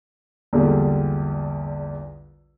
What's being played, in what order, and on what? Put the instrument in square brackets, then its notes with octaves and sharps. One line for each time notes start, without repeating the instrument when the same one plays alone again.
[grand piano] A#1 E2 D3 G3 G#3